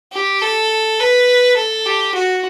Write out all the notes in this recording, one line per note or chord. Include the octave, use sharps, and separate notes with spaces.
G4
A4
B4
A4
G4
F#4